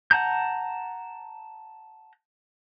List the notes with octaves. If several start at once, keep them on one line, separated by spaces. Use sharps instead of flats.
F#5 A5 A#5 G6